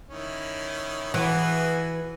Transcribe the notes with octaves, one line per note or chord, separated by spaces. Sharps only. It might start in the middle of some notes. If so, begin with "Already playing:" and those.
D#3 C#4 E4
E3 B3 F#4 G#4